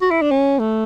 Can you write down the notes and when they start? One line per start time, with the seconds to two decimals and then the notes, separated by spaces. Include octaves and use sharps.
0.01 F#4
0.11 E4
0.21 D4
0.31 C#4
0.59 A3